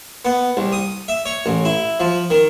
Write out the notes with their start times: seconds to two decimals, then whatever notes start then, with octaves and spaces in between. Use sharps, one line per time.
0.25 B3
0.57 C2
0.73 D#6
1.08 E5
1.26 C#5
1.46 A1
1.65 E4
2.00 F3
2.30 D#3